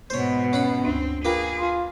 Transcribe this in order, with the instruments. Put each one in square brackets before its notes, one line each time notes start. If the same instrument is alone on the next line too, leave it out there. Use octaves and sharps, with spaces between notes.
[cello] G#2 B2 [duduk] B3 [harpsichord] C5 C#5
[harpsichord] C#4 F#5 B5
[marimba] D2 G2 D4 [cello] C4
[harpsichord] A#3 B4 [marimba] F4 A#4 G5 [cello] G#4
[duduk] F4 [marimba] C6